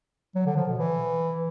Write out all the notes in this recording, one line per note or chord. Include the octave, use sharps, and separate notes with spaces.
F#3
D3
F3
B2
E3